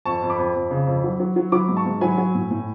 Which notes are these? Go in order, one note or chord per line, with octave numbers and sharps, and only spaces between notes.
F2 A5 C#6
F2
B5 D6
F2
F2
C#3
F2
F#3
F#3
F#3
F#3 B5 D6
G#2
A5 C#6
G#2
F#3 G#5 B5
F#3
A2
A2